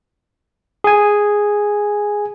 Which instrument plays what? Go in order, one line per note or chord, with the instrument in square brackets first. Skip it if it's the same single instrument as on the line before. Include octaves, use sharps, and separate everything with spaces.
[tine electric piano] G#4 G#5